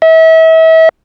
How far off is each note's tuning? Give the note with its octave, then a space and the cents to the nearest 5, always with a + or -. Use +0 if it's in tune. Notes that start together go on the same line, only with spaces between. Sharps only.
E5 -35